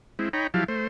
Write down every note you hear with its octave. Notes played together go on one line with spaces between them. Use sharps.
G#3 C4 E4
D#4 C#5 G5 A#5 B5
F3 F#3 E4 G4 F5 A5
A3 C5